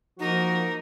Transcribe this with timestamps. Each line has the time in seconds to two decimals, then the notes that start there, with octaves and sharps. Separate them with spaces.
0.19 F3 A#3 D#4 F#4 A#4